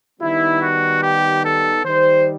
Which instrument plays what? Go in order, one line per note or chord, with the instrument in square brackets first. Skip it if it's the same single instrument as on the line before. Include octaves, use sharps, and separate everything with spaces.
[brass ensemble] D#3 G3 B3 D#4 E4
F#4
G4
A4
D#3 G3 D#4 C5